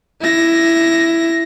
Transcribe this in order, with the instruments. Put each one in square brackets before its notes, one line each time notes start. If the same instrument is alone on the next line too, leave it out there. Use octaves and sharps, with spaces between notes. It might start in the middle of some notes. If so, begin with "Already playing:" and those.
[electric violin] E4 A#6